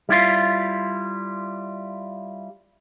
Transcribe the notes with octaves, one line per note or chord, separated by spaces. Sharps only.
G3 E4 F4